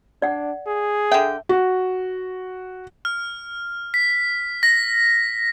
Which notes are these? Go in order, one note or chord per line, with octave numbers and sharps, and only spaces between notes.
D4 D5 F#5
G#4
D3 E5 G5
F#4
F6
B6
A#6